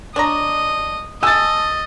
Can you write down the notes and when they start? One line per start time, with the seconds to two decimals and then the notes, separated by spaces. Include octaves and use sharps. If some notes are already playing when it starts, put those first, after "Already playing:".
0.16 D4 C#5 D#5 A#5
1.23 D#5 G#5 A5 E6 A6